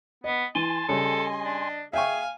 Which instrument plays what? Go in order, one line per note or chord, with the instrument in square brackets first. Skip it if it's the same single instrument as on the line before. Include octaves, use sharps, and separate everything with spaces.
[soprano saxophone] B3 [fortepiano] D#5
[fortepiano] E3 [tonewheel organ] G#5 C6 [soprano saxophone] A5
[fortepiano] C#3 G3 [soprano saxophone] A4 [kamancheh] D#5
[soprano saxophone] D4
[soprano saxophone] G#4 [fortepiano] E5 G5 C#6 [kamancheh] F5 G#5